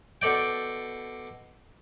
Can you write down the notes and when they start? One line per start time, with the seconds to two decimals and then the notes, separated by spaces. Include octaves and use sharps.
0.22 B2 A4 D5 G5